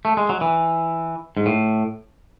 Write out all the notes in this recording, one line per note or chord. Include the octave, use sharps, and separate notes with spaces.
A3
G#3
F#3
E3
G#2
A2